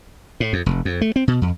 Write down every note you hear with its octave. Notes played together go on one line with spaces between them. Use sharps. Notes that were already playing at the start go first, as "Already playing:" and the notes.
A2
F2
F1
F2
A3
C4
B2
F2